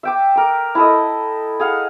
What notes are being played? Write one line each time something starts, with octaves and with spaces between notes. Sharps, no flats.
E5 G5 D6
A#4 D6
E4 A4 D#5
G#4 F5 F#5